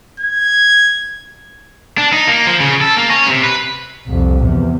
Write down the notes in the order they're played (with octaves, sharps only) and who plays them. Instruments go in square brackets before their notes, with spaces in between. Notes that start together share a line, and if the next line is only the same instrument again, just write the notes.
[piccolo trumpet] G#6
[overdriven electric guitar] D4
D#4
A#3
F3
C#3
A4
A#3
C#4
C3
B4
[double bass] C2 F2
E2 C3